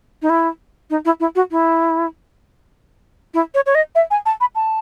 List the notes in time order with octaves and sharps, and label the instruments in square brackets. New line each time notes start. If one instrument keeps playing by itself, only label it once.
[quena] D#4
E4
D#4
E4
E4
F#4
E4
E4
C#5
C#5
D#5
E5
G#5
A5
B5
A5